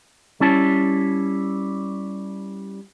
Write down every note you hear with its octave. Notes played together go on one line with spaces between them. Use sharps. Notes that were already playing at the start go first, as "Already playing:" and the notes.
G3 C#4 E4 A5